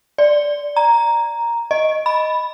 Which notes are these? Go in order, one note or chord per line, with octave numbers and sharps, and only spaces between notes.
D5
A#5
D#5
B5